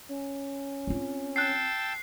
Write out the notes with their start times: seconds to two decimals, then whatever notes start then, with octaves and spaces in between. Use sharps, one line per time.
0.09 C#4
0.87 C4 F4
1.36 G5 A5 E6 F#6 C7